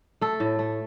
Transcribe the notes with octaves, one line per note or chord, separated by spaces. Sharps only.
A3 A4
A2
A3